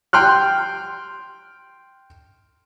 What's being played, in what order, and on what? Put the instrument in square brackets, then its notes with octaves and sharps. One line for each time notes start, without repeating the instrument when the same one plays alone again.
[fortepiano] G5 C6 F6 F#6